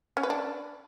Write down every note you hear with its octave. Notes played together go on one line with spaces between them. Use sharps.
C#4
B4
D4